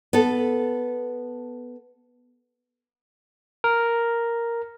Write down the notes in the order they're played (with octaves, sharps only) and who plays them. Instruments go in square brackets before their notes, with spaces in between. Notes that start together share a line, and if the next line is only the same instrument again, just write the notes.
[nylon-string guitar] B3 A4
[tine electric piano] A#4